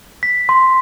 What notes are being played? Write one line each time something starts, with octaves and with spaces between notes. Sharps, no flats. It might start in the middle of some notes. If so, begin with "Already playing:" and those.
B6
C6